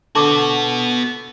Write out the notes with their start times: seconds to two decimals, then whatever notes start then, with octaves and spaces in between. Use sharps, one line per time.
0.15 D3 B3 F#4 A5 C#6 D6